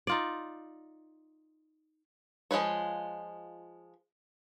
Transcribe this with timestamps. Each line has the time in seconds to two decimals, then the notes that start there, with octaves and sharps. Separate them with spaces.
0.07 D#4 F4 D5
2.51 F3 G#3 F4 B4 C#5